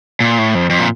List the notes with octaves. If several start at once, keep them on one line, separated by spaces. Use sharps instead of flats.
A#2
A2
F2
F2
A#2